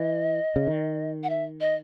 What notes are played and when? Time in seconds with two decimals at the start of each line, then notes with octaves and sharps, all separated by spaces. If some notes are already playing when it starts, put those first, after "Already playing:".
Already playing: E3 D#5
0.56 C#3
0.67 D#3
1.23 F#5
1.30 E5
1.61 D#5